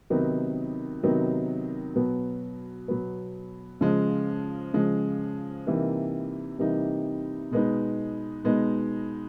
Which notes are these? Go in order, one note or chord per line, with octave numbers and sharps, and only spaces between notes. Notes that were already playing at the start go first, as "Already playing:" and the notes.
C3 D#3 F#3 B3 D#4
C3 D#3 F#3 B3 D#4
B2 F#3 B3
B2 F#3 B3
C#3 F3 G#3
C#3 F3 G#3
C3 E3 G3 A#3 D#4
C3 E3 G3 A#3 D#4
B2 G#3 B3 D#4
B2 G#3 B3 D#4